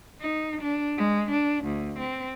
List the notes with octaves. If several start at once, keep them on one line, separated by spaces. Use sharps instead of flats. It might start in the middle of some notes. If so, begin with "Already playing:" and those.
D#4
D4
G#3
D4
D2
C4